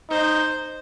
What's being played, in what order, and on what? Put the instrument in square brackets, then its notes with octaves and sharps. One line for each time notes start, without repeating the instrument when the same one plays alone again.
[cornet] D#4 [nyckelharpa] C5